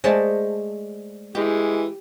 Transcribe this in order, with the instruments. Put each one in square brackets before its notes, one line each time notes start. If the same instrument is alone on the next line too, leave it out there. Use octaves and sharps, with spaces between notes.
[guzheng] G#3 A3 A5 [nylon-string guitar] C5 D5 D#5
[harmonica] E3 G#3 [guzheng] G4